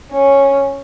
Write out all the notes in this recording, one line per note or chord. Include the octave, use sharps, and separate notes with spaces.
C#4